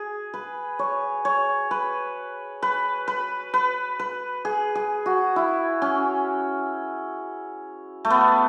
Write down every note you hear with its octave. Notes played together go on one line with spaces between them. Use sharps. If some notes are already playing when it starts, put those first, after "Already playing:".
Already playing: G#4
B4
C#5
C#5
B4
B4
B4
B4
B4
G#4
G#4
F#4
E4
C#4
A3
B3